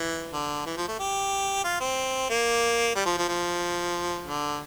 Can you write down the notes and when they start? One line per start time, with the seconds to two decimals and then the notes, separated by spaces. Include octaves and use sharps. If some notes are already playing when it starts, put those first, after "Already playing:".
Already playing: E3
0.33 D3
0.66 E3
0.77 F3
0.88 A3
0.99 G4
1.64 F4
1.80 C4
2.29 A#3
2.95 G3
3.06 F3
3.17 F3
3.28 F3
4.27 D3